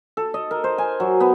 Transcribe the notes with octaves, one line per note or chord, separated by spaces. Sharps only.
A4
D#5
A#4
C5
G#5
F#3
B3